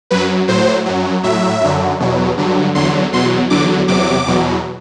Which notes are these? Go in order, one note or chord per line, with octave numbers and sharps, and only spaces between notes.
F#2 F#3 B4
A2 F#3 C5
F#2 F#3
A2 F#3 E5
F#2 D3 F#3
E2 B2 F#3
G2 D3 F#3
E2 D3 F#3 C6
E2 B2 F#3 C6
E2 D3 F#3 D6
E2 C3 F#3 D6
E2 B2 F#3